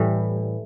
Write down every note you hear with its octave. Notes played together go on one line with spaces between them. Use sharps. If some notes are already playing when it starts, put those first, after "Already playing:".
Already playing: A2 E3 G3